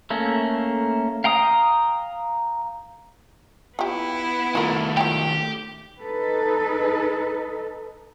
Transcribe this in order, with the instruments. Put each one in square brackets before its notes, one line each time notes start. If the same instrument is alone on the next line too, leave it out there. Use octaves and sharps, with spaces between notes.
[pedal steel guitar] A3 A#3 C#4
F5 G5 A#5 D#6
[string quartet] B3 E4 [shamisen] F4 G4
[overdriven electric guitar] D#3 A3 [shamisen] F4 A#4
[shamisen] F4 G5 [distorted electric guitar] G4
[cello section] D#4 A4 B4